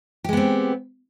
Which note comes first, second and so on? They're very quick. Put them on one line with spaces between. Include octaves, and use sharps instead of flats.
G4 G#3 B3 C4